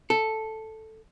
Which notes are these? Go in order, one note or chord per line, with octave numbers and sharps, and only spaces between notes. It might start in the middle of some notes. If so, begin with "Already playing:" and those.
A4